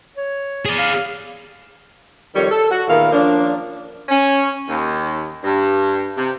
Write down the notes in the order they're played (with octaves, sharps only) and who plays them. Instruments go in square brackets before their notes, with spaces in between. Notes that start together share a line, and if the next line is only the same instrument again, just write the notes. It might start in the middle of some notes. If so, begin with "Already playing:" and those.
[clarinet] C#5
[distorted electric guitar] G#4 D5
[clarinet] F5
[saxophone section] F2 D#3 G3 C#5
A4
F#4
E2 A#2 D#3 E4 A#4 F5
F3 A#3 C#4 D4
C#4
D#2
G2
C3